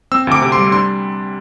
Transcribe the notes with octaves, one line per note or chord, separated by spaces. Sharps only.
C4 E6
D2 D6
C3
C6
G3
D4 C6